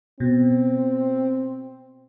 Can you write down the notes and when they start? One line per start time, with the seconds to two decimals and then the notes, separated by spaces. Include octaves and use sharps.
0.20 B2 C4